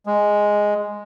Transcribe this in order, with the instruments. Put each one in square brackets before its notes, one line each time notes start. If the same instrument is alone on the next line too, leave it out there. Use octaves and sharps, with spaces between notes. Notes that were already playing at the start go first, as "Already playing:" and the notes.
[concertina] G#3